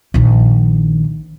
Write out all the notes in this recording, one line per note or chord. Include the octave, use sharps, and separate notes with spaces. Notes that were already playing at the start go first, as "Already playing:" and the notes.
A#1 D#3